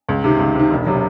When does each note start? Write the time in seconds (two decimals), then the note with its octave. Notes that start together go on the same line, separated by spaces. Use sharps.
0.09 C#2
0.24 C3 D#3
0.39 C#2
0.55 C3 D#3
0.71 E1
0.86 C3 F#3